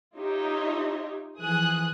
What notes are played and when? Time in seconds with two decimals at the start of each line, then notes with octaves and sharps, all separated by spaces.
0.15 D#4 F4 G4 C#5 D#5 E5
1.38 E3 F3 G#4 G#5 D#6 F#6